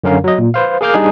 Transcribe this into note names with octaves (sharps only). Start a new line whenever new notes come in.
F#2 D3 C#4 A#4 F5
F#3 D#5
A#2
B4 C5 F5
G#4 A#4 F5 D6 F6 G6
G3 D4 D#4 G#4